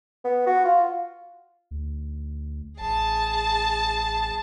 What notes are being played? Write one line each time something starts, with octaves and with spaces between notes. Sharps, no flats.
B3
F#4
F4
D2
A1 G#4 A5